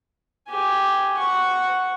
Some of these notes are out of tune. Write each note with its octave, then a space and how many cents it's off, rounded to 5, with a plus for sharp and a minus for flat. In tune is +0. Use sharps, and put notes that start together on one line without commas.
G4 -5 G#5 +0
F#5 +0 C#6 +0